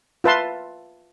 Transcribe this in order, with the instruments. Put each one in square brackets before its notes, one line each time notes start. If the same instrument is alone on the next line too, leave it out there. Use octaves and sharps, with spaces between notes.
[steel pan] F4 B4 E5 A5 C6